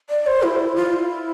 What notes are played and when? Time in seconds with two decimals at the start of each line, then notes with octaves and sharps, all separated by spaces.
0.10 D5
0.27 C5
0.43 E4
0.76 F4
0.93 E4